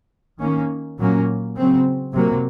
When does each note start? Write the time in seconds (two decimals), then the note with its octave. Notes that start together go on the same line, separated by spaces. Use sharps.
0.39 D#3 A#3 C#4
0.98 A#2 F#3 A#3 C#4
1.56 C#3 F#3 C4
2.13 C3 F#3 A#3